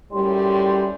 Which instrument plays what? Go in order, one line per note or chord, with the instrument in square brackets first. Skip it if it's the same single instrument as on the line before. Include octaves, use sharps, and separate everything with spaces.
[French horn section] F#2 A2 G3 [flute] C6